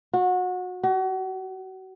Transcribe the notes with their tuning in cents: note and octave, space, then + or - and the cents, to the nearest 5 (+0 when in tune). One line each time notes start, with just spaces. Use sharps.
F#4 -25
F#4 +35